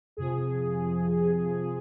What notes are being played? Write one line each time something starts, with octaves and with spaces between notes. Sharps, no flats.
F2 C3 F3 G#4